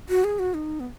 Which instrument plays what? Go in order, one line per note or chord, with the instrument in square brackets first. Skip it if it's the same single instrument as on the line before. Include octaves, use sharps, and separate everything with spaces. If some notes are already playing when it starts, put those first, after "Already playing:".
[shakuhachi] F#4
G#4
F#4
D#4
B3